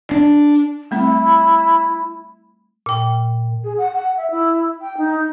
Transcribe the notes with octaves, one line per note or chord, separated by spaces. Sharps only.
D4
G3 A3 C4 E4
A#2 G5
G#4
F#5
F#5
E5
E4
G5
D#4